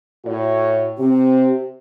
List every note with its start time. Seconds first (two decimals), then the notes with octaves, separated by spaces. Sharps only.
0.25 A2 F#4 C#5
0.98 C3 C4 G4